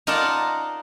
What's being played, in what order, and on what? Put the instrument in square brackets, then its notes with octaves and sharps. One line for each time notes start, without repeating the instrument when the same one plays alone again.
[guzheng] D#4 F4 A#4 D5 F#5 A5